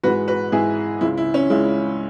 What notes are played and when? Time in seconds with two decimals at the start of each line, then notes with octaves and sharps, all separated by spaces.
0.03 G#2 E3 G#3 F#4 B4
0.28 F#4 B4
0.52 G#2 E3 G#3 E4 G#4
1.01 C#2 C#3 G#3 E4
1.17 E4
1.34 C#4
1.50 C#2 C#3 G#3 E4